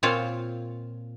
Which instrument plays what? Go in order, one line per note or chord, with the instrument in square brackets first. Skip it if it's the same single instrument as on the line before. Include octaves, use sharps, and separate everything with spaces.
[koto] A#2 C4 F4 C#5 F5